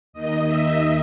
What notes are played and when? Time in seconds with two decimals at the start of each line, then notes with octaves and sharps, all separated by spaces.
0.13 D#2 D#3 D#5
0.46 E5